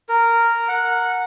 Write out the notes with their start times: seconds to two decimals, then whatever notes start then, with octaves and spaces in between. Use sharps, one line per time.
0.09 A#4
0.68 F#5